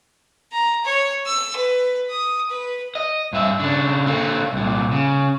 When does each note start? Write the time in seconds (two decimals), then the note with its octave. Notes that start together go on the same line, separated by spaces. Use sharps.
0.52 A#5
0.84 C#5
1.26 E6
1.56 B4
2.10 D#6
2.50 B4
2.95 D#5
3.33 G2 E5
3.60 C#3 D4
4.06 D3 A#3
4.53 C2 A#2
4.92 C#3